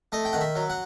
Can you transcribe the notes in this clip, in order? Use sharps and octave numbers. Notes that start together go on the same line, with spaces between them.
A3 D#5
G5
D#3 F#5
E5
F#3
F#5